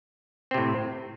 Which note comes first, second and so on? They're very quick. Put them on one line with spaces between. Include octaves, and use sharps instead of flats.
C4 C3 A2